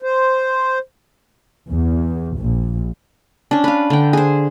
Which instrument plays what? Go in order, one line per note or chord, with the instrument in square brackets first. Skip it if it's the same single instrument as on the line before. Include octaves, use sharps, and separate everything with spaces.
[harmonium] C5
[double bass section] E2
A#1
[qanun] C#4 D4
B4 F5
D3 G5
G#4 C5